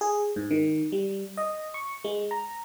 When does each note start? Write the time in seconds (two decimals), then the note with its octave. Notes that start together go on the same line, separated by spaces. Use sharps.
0.01 G#4
0.36 G#2
0.51 D#3
0.92 G3
1.37 D#5
1.74 C#6
2.04 G#3
2.31 A#5